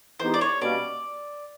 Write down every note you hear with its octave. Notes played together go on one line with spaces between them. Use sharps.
E3 G#3 B3 D#4 G4 C5
D5
C#5
B2 G3 A#3 C#4 D5